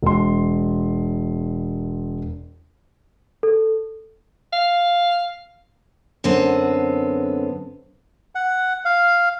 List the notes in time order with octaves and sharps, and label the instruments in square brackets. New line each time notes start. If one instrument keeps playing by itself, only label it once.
[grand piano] E1 C6
[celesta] A4
[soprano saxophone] F5
[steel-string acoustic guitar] F#2 D3 B3 C4
[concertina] F#5
F5